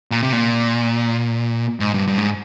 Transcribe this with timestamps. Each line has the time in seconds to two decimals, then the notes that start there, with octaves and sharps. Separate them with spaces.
0.11 A#2
0.23 C3
0.33 A#2
1.80 G#2
1.94 G2
2.07 G2
2.18 G#2